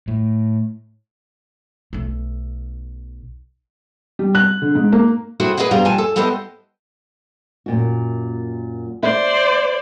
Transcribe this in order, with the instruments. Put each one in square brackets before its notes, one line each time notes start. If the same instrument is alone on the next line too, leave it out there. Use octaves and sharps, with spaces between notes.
[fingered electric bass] A2
[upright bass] B1 A3
[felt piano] G3
F#6
D3
G#2
A#3
[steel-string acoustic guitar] C4 E4 F#4 G#4 A4
G#4 B4 D5 D#5 F#5
G2 B2 F3 G3 F4 A#5
D#2 G#2 F3 G4 G#5 A5
A4
G3 B3 E4 A4 C5 D#5
[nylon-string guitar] F#2 A#2 F#4
[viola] C5 D5 [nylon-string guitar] E5